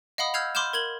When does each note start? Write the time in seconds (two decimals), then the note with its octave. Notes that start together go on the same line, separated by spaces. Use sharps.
0.18 D#5 F5 F#5 B5 D#6
0.34 E6 F6 G6 G#6 C7 F7
0.55 B5 C6 D6 F6 G6 E7
0.73 A#4 G#6 F#7 G7